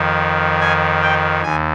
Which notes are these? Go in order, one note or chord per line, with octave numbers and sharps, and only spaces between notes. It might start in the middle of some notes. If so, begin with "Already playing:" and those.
Already playing: F2 D#3
G#5
G5
D#2 G#5